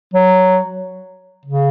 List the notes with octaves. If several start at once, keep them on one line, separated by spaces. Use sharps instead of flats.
F#3
C#3